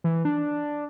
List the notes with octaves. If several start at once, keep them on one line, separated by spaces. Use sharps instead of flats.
E3
D4